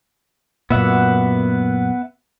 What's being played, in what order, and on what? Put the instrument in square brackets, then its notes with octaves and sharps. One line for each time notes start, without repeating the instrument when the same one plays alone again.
[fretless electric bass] F#2 A#2 [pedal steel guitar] B3 E5 F#5